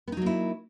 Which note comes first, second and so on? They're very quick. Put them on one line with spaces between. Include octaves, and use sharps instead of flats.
B3 D#4 F#3 A#3 E4